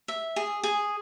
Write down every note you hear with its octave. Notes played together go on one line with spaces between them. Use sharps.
E5
G#4
G#4